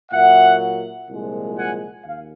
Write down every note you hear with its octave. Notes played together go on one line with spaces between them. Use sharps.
A#2 F#3 A#3 E5 F#5
C2 A#2 F3 G#3
F#5 G#5
D#2 F5